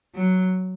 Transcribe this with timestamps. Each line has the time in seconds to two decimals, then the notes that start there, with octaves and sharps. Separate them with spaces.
0.15 F#3